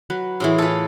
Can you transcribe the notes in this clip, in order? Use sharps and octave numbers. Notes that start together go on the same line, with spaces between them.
F#3 B4
A2 E3 E4 G#4 C6
F4 A4 B4 F5